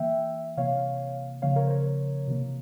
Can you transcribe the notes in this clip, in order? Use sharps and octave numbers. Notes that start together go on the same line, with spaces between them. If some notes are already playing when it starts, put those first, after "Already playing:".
Already playing: E3 A#3 E5 G5
C3 E3 A#3 C#5 F5
C#3 F3 A#3 C#5 F5
A#4 C#5
C5
A#4 C#5
C3 E3 A#3